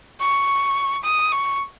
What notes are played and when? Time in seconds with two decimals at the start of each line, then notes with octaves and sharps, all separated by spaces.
0.20 C#6
1.04 D#6
1.32 C#6